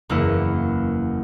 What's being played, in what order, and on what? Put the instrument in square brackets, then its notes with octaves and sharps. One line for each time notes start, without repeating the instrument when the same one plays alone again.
[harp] F#1 E2 A#3 E4 C#7